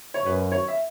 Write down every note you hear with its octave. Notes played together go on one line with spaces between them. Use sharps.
C#5
F#2 B4
C#5
E5